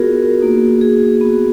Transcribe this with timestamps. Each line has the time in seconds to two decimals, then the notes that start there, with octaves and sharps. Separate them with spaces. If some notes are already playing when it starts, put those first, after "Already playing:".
Already playing: B3 F4 F#4 G#4 A#4
0.40 A#3 D#4 F#4
0.81 G#4
1.21 B3 F#4